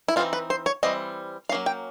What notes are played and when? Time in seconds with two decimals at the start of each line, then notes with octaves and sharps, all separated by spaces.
0.08 E4
0.16 E3 G3 C4 D#4 F4
0.33 B4
0.50 C5
0.66 C#5
0.83 E3 G3 C4 D#5
1.49 F#3 A#3 C#4 F5
1.66 G5